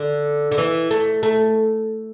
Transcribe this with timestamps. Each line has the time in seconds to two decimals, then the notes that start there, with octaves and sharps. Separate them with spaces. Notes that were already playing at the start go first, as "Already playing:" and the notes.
Already playing: D3
0.52 D3
0.58 E3
0.91 A3
1.23 A3